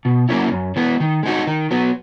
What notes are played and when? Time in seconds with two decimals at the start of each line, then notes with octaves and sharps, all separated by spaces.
0.05 B2
0.29 F#3 A#3 C#4 E4
0.52 F#2
0.76 E3 G#3 B3
1.00 D#3
1.23 G#3 D#4 F#4
1.47 D#3
1.71 F#3 B3